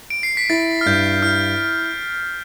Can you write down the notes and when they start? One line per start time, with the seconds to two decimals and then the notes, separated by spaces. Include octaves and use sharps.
0.10 D7
0.23 C7
0.37 B6
0.50 E4 A6
0.81 F6
0.86 G2 G6
1.22 E4 F6